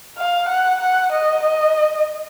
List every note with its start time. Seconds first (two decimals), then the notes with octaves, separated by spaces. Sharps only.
0.18 F5
0.48 F#5
0.81 F#5
1.12 D#5
1.43 D#5